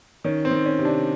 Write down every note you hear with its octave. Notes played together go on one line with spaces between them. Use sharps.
D#3 C#4
C4
D#3
C#4
C3
D4